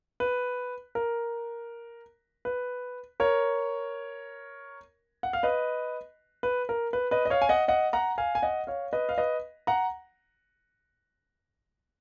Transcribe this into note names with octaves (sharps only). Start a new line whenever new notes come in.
B4
A#4
B4
A#4 C#5
F#5
F5
B4 D#5
B4
A#4
B4
B4 D#5
D#5
C#5 F5
G#5
D#5 F#5
D#5 F#5
F#5 A#5
F5 G#5
G#5
D#5 F#5
C#5 F5
B4 D#5
F5
B4 D#5
F#5 A#5